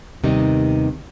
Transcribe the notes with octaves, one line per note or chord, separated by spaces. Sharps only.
D#2 C3 D#3 G3 B3 D#4